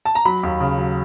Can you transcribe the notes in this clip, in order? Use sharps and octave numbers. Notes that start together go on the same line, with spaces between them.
A5
A#5
F#3 B5
D#2
C#3
F#3